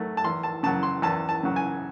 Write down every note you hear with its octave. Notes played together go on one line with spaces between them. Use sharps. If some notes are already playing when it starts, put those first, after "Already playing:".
Already playing: F#3 A3
A5
E2 C6
A5
C#3 F#3 A5
C6
E2 A5
A5
C#3 F#3
G#5